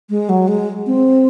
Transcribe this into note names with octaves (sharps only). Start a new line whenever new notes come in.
G#3
F#3
G#3
C4